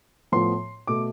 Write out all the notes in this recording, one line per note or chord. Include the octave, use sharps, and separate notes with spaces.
A2 F3 B3 C6
B2 A3 D6